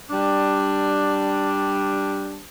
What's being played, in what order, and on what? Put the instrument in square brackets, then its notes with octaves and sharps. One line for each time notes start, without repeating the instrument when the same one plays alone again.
[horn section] G3 D4